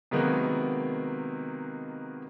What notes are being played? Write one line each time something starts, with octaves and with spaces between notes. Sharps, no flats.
C3 D#3 F#3 G#3 A#3 B3